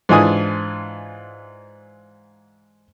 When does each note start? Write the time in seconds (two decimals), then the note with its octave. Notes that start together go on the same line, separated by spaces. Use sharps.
0.09 G#2 E3 D4 F4 G#5 D#6